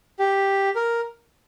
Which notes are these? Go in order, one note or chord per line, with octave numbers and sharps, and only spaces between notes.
G4
A#4